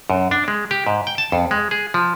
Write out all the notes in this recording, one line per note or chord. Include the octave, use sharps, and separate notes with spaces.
F#2
D4
G#3
G4
G#2
G5
A5
F2
G#3
G#4
F3